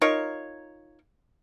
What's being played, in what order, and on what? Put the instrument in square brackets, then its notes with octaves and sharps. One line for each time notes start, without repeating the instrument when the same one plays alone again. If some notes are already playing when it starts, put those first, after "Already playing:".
[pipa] D#4 F4 A#4 C#5